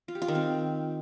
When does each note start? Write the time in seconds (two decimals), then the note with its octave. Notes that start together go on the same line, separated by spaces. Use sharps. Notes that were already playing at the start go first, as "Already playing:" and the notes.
0.08 F4
0.15 G4
0.22 F4
0.28 D#3
0.35 C4